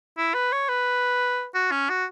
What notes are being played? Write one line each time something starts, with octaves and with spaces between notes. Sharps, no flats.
E4
B4
C#5
B4
F#4
C#4
F#4